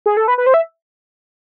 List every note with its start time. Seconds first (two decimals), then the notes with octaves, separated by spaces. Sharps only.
0.06 G#4
0.17 A4
0.28 B4
0.38 B4
0.46 C5
0.54 E5